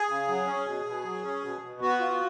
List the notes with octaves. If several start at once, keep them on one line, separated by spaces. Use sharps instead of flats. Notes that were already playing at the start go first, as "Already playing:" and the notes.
Already playing: G#4
C#3
F#3
C#4
B2
B2
F#3
C#4
B2
B2
B3 F#4
F4